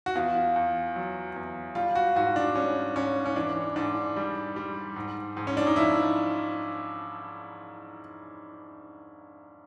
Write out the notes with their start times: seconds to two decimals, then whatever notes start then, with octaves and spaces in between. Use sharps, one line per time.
0.06 F#4
0.15 E2 F4
0.56 E2
0.96 F#3
1.36 E2
1.75 G3 F4
1.95 F#4
2.16 G#2 F#4
2.36 D4
2.55 G3 C#4
2.96 G#2 C#4
3.26 C#4
3.36 E3 D4
3.76 G#2 D4
4.16 G3
4.56 G3
4.96 G#2
5.37 G#2
5.47 C#4
5.57 D4
5.66 D#4
5.76 F3 E4